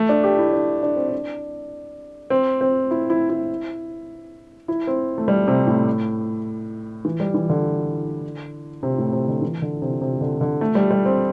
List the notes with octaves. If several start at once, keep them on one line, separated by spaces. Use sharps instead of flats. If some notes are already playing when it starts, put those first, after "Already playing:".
Already playing: A3
D4
G4
E4
D4
D4
C4
D4
C4
C4
E4
E4
E4
E4
C4
A3
G3
C3
A2
E3
G3
E3
D3
C3
A2
C3
D3
E3
D3
C3
C3
D3
D3
A3
G3
G3
C4